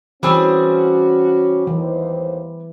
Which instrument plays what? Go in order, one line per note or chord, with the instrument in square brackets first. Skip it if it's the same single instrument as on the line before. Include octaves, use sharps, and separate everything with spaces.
[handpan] E3 [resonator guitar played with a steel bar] G3 C4 G#4 [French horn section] C#4 F#4
[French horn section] D#2 C5 [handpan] E3